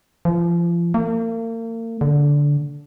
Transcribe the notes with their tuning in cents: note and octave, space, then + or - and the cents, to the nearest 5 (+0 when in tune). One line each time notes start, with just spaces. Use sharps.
F3 -35
A#3 -40
D3 -15